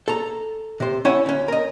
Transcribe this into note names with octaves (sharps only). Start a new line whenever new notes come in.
A4 A#5
C3 C5
C#4 E4 C#5 F#5 A5
D2 C#4
A#4 D#5